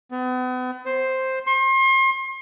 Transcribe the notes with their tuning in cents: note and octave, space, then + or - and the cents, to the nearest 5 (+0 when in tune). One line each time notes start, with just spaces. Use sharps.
B3 +40
C5 +5
C6 +40